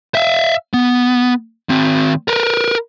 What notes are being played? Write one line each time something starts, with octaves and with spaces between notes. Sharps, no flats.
E5 F5
B3
D#3 C4
A#4 B4